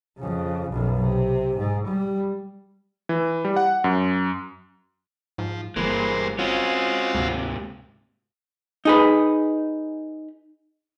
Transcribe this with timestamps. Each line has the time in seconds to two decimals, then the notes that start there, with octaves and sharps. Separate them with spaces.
0.19 F2 C#3
0.72 B1 F#2
1.01 C3
1.58 G#2
1.88 G3
3.09 E3
3.45 G3
3.56 F#5
3.84 F#2
5.38 G#2 F3
5.76 G1 G2 E3 G#3 A#3 C5
6.39 G#3 C4 C#4 F4 F#4
7.14 D2 G#2 C3
8.85 D#4 G#4 B4